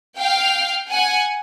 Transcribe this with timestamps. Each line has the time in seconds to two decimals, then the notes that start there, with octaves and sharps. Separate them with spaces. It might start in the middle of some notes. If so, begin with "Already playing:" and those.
0.18 F5 G5
0.91 F#5 G#5